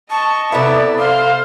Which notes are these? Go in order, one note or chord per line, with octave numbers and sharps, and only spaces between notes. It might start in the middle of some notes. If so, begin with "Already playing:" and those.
D#5 A5 C#6
C3 B3 E4 A4 D5 E5
C5 F5 C6